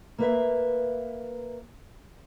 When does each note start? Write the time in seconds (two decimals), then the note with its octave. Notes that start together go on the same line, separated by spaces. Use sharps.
0.18 A#3 B4 E5